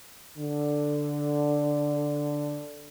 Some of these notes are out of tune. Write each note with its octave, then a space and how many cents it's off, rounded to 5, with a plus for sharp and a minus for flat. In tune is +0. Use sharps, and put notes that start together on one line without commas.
D3 +0